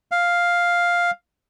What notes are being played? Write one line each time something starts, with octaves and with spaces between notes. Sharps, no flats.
F5